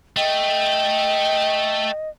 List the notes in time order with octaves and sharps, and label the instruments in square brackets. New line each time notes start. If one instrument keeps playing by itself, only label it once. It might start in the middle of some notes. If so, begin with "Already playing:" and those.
[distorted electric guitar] A3 [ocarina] D#5 [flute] G5